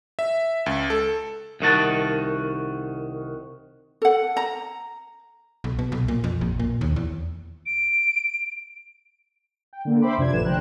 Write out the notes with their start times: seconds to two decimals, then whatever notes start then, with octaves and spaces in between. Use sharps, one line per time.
0.19 E5
0.66 C#2
0.90 A4
1.60 C2 D#3 F#4 A5
4.02 A4 F#5
4.37 A#5
5.64 B1
5.79 B2
5.92 B1
6.08 A#2
6.24 F2
6.41 A#1
6.60 A#2
6.81 D#2
6.96 E2
7.66 D7
9.73 G5
9.85 D3 A#3
10.01 C5 E5 G5 B5 C6 D6
10.17 F2 C3 D4 F4 G#6
10.33 A1 D3 F3 B4 E7
10.45 D3 G#3 C5 G5 A#5 F#6